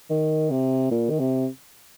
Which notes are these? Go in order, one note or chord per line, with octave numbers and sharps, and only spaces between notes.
D#3
C3
A#2
D#3
C3